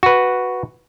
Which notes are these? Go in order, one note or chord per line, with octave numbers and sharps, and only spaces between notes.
F#4 B4